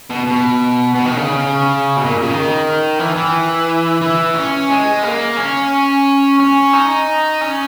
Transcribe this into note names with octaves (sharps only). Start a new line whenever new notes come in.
B2
B2
B2
D#3
C#3
B2
A#2
C#3
D#3
E3
E3
E3
C#4
G#3
A#3
C#4
C#4
D#4
C#4